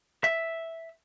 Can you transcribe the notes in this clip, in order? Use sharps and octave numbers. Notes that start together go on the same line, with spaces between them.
E5